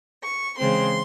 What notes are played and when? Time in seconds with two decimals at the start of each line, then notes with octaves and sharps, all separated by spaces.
0.23 C#6
0.58 C#3 E3 G#3 C4 C6